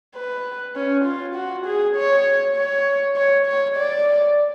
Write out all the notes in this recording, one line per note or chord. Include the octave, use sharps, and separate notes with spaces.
B4
C#4
F4
F#4
G#4
C#5
C#5
C#5
C#5
D5